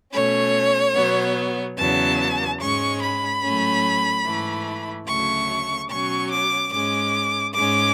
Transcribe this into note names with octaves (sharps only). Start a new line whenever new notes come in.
B2 A3 C#4 C#5
B2 F#3 B3
E2 C#3 F#3 B3 A5
G#2 G#3 C#4 C#6
B5
A2 F#3 A3 C#4
G#2 E3 A3
D2 C#3 F#3 A3 C#6
B2 F#3 C#4 C#6
D6
G#2 G#3 C#4 D6
G#2 G#3 C#4 D6